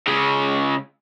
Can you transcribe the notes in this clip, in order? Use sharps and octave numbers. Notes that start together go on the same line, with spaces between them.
C#3 G#3